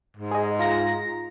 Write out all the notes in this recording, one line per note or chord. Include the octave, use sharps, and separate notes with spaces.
G#2
G#4 D#5
F4 A#5 A#6